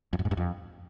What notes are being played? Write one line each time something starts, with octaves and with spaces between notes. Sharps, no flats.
F2
F#2
G#2
G2
F2